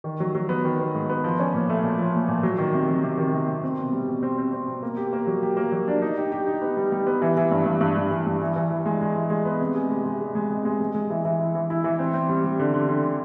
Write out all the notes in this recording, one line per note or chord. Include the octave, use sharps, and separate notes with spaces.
D#3
F#3
F#3
B3
D#3
B3
G#2
B3
F3
C#4
A#2
A3
A#2
F3
A#2
A#2
F#3
D#3
C3
F#3
C3
D#3
C3
C3
C4
B2
G3
B2
C4
C4
C4
B2
A#3
G4
A#3
F#3
G4
A#3
F#3
D4
D#4
G4
G4
D#4
B3
G3
G3
B3
E3
E3
G2
G2
G2
G2
E3
G2
E3
E3
E3
G#3
G#3
E3
G#3
B3
C3
G#3
G#3
G#3
G#3
G#3
G#3
G#3
G#3
G#3
E3
E3
E4
E3
E4
E3
C4
C4
G3
G3
D3
D3
D3
D3